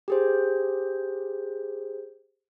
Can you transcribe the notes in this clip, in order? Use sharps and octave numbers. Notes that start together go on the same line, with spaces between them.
G4 G#4 C5